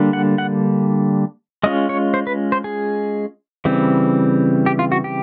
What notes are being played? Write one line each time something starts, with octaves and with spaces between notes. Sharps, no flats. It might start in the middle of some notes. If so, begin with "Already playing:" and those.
Already playing: D3 G3 A#3 D4
F#5
F#5
G#3 C#4 F4 D#5
C#5
C5
B4
C5
G#4
C#3 E3 G3 C4
G4
F4
F#4
G4